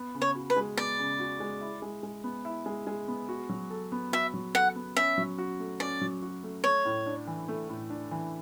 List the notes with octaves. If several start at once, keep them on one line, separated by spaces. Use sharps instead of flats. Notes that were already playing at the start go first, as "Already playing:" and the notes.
Already playing: B3
C#3
C#5
F#4
B4
G#3
B3 D5
C#3
F#4
G#3
E4
G#3
G#3
B3
E4
G#3
G#3
B3
F#4
F#3
A4
B3
F#4 E5
F#3
A4 F#5
B3
C#4 E5
F#3
F#4
A3
C#4 D5
F#3
F#4
A3
A3 C#5
A2
D4
E3
A3
A2
D4
E3